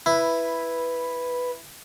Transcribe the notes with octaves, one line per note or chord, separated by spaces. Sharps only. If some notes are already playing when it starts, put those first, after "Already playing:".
E4 B4